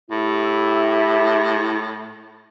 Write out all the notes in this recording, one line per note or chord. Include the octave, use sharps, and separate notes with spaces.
A2 E4 G4 E5